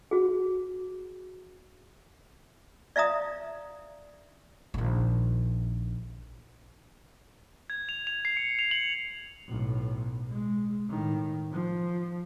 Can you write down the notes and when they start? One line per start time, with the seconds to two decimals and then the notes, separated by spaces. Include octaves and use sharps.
0.11 F#4 G#4
2.96 D5 E5 F5 A#5 D#6
4.74 A#1 D#3
7.70 G#6
7.89 F7
8.07 F7
8.25 C7
8.37 C#7
8.59 F7
8.71 F#7
9.48 B1 A2
10.30 G#3
10.88 A2 D#3
11.52 F3